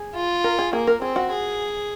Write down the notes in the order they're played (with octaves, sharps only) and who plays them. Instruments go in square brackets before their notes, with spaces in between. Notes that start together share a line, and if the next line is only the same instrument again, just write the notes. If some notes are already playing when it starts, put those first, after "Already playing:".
Already playing: [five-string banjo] G#4
[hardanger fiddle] F4
[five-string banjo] A#4
G#4
[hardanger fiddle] A#3 [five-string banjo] G#4
[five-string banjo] A#4
[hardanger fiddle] C4 [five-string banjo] G#4
[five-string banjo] F#4
[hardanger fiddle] G#4